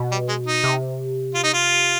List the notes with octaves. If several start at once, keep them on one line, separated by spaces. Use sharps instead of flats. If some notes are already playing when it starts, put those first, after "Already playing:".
Already playing: B2
G3
G#3
D#4
C3
F4
D#4
F4